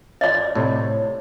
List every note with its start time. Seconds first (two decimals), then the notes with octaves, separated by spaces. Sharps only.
0.21 D5 D#5
0.55 A2 C3 C#5